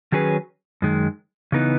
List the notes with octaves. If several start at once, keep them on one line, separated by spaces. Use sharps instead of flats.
D#3 F#3 C#4 G#4 B4
F#2 D#3 G#3
C#3 E3 B3 D#4